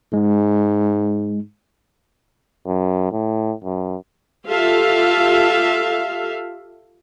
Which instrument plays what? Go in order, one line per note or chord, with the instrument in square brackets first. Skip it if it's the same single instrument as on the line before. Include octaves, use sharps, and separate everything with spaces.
[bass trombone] G#2 [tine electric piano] G#3
[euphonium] F#2
A2
F#2
[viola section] F4 G4 A4 E5 F5